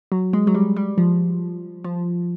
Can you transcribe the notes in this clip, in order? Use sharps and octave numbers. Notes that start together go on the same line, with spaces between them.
F#3
G#3
F#3
G3
G3
F3
F3